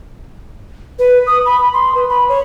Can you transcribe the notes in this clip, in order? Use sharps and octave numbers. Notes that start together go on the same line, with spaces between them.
B4
D#6
B5
C6
B4
B5
C#5